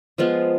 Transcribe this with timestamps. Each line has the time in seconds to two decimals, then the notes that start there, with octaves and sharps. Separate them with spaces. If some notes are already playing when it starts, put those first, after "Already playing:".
0.18 F3 G#3 B3 F4